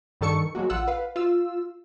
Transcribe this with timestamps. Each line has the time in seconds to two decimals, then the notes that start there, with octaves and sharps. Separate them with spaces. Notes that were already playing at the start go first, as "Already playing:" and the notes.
0.21 G2 D#3 A4 C#6 C#7
0.55 F#3 G#3 A#3 F#4
0.70 A1 F4 F#5 E6
0.88 B4 F5
1.16 F4 E6